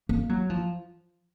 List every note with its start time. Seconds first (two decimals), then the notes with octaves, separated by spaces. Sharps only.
0.09 A#3
0.29 F#3
0.50 F3